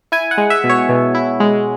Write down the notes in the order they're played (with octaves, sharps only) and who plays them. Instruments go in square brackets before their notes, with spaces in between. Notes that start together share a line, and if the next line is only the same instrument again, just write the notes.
[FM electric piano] E4 G#5
F#5
G#3
E5
B2
C#5
B2
E4
G#3